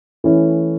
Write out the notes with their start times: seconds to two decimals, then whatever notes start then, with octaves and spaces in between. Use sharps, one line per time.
0.24 E3 A3 C#4 E4